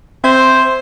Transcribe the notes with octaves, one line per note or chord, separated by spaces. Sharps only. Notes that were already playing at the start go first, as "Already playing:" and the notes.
C4 C5 E5 G#6